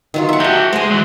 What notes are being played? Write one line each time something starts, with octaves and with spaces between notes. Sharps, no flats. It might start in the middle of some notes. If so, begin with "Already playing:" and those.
D#3 F#3 F4
E5 F#5
F#4 G4 A4 G#5
G#3 C5 G#5
E3 F#3